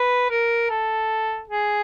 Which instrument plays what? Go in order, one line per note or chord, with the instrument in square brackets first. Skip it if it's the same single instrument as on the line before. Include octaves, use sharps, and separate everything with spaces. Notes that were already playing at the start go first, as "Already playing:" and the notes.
Already playing: [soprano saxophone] B4
A#4
A4
G#4